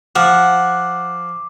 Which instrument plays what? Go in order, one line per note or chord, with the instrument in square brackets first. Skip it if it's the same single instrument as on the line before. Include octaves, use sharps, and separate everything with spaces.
[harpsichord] F3 [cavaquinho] F#5 [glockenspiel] D6